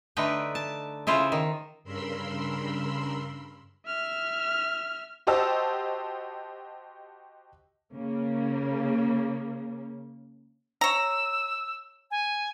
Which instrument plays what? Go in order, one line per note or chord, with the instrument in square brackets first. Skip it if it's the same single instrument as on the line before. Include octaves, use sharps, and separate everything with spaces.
[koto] D3 A3 D#4 B4 G5
A5
C#3 E4 F4 C5
D#3
[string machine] G2 C#3 A#4 B5 C6 E6
[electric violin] E5 F6
[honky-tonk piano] F#4 G4 C5 D#5 A5 E6
[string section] C#3 A#3
[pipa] C#5 A#5 [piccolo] E6
[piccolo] G#5